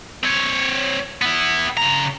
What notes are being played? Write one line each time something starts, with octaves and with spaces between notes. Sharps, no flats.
C4 C#5
B3 E4
C#3 A#5